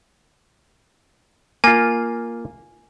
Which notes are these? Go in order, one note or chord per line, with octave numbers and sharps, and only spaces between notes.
A#3 F4 G#5